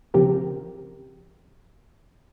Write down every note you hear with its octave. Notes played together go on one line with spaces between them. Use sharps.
C#3 F3 C4 G4 A#4